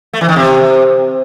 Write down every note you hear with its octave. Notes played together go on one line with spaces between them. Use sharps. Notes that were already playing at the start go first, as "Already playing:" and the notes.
A3
E3
D#3
C3